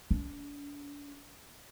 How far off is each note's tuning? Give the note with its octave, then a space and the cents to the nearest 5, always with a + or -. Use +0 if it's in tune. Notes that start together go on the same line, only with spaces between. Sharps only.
D4 -40